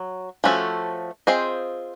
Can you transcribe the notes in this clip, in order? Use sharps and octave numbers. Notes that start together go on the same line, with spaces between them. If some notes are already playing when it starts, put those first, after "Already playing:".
Already playing: F#3
F3 A3 C#4 F#4 A4
C4 F4 G#4 C5 D#5